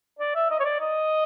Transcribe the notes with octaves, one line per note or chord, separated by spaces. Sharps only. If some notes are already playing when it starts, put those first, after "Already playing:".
D5
E5
D#5
C#5
D5
D#5